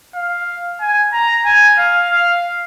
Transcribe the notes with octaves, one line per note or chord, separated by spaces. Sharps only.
F5
G#5
A#5
G#5
F5
F5